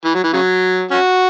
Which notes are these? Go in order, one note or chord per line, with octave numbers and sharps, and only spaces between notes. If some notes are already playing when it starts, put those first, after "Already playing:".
E3
F#3
E3
C#3 F#3
C#4 F#4